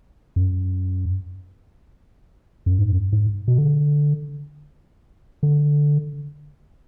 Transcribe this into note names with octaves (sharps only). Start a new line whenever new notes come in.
F#2
F#2
G#2
F#2
G#2
B2
D3
D3